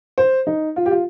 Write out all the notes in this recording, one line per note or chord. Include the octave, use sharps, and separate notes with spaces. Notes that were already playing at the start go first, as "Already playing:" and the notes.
C5
D#4
F4
G4
F4